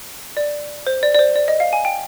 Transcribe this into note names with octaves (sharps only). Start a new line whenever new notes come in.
D5
C5
D5
D5
C5
D5
D#5
F5
G#5
G5